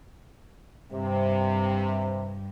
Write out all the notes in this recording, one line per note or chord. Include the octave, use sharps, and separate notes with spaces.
G2 C3